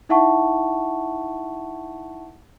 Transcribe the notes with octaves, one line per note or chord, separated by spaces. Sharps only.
D#4 E4 E5 F#5 A5 C#6